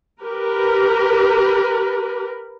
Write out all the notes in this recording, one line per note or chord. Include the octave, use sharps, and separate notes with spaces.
G4 A#4 B4